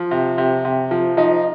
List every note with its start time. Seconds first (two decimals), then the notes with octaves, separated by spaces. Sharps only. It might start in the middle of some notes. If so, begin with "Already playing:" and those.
Already playing: F3
0.11 C3
0.38 C3
0.65 C3
0.91 F3
1.17 F3 D#4